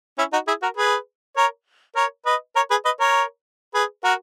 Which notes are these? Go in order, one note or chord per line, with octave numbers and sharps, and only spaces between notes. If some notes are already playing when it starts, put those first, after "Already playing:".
C#4 E4
D#4 F#4
E4 G#4
F#4 A#4
G#4 B4
A#4 C#5
A#4 C#5
B4 D#5
A#4 C#5
G#4 B4
B4 D#5
A#4 C#5
G#4 B4
F#4 A#4